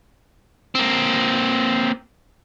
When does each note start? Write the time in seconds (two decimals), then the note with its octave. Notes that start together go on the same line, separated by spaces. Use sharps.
0.75 A#3 C4